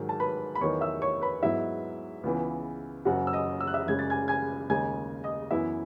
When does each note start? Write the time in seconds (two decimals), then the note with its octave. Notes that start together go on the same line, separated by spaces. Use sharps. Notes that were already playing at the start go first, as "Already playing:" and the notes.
Already playing: G#2 D#3 F#3
0.09 A5
0.20 B4 B5
0.55 B5
0.61 E2 D#3 F#3 B3 C#5 C#6
0.81 E5 E6
1.02 C#5 C#6
1.21 B4 B5
1.42 G#2 F#3 B3 E4 E5
2.24 C#2 C#3 E3 B3
3.05 F#1 F#2 C#3 F#3 F#4 F#5
3.27 E6
3.33 D#5 D#6
3.61 E6
3.67 F#6
3.74 E5 E6
3.87 F#2 C#3 G#3 C#4 G#6
3.99 A6
4.10 G#5 G#6
4.28 G#5 G#6
4.69 D#2 C#3 G#3 G#5 G#6
5.24 D#5 D#6
5.51 F#2 E3 B3 E4 E5